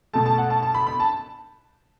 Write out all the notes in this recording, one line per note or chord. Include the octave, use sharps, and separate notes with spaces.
B2 A3 A5
A5
F#5
A5
A5
B5
B5
A5